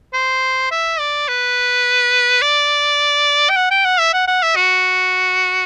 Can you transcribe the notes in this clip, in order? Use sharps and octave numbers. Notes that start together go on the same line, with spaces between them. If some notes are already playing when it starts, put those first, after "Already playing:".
C5
E5
D5
B4
D5
G5
F#5
G5
F#5
E5
F#5
F#5
E5
F#4